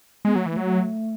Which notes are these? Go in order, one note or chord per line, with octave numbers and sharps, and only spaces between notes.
G#3 B3
F#3 A3
E3
A3
F#3
A3